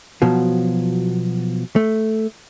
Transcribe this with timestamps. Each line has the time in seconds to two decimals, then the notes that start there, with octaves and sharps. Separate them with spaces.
0.22 B2 F3 F#3
1.76 A3